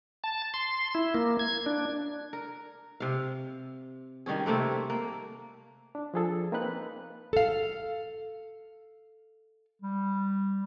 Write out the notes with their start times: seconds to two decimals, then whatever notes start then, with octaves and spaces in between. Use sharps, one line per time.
0.24 A5
0.54 C6
0.95 E4
1.15 A#3
1.39 G#6
1.66 D4
2.33 A#4
3.00 C3 F5
4.26 D#3 G3 C#4 G#4
4.46 C3 A3 A#3 C4
4.90 A#3
5.95 D4
6.14 F3 G#4 A4
6.52 A#3 C4 D#4 B4 F#6
7.33 A4 F5
9.82 G3